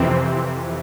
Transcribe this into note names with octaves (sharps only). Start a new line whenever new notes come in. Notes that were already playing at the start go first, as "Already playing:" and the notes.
Already playing: F2 C3 E3 C4